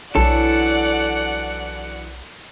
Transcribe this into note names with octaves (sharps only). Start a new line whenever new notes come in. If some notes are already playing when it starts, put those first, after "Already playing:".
B1 E3 F#3 D4 A4 D5 F#5